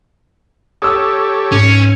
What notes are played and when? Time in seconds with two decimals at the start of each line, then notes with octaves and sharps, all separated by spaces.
0.82 G4 A4 C#5 D#6 E6
1.52 G#2 C#4